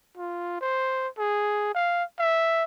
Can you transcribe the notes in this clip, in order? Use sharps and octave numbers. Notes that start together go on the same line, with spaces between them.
F4
C5
G#4
F5
E5